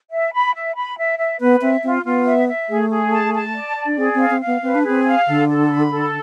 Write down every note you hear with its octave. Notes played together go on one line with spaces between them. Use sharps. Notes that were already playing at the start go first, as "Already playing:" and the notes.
E5
B5
E5
B5
E5
E5
B3 B4
C4 E5
C4 F4
B3 F4
E5
E5
A3 G#4
G#4
A5
A5
D5
D5
D4
C4 G#4
C4 F5
C4
F5
B3
C4 B4
D4
C4 G#4
F5
D3 A4
A4
B5
A4